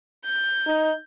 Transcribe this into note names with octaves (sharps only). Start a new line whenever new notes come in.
G6
D#4